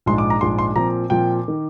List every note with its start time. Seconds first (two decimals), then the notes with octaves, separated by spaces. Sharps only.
0.06 A#1 G#2 F3 G#3 C6
0.18 D6
0.30 A#5
0.41 A#1 G#2 F3 G#3 C6
0.58 C6
0.76 A#2 F3 C4 A#5
1.10 A#2 F3 C4 G5
1.48 D#3